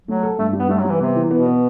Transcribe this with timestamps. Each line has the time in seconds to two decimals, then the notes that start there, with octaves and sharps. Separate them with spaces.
0.07 F#3 A3
0.23 A4
0.39 G2 A3
0.53 G3
0.59 B3
0.69 G3 A3
0.80 F#3
0.85 E3 G3
0.99 C3 B3
1.15 E3
1.31 B2 B3
1.46 B3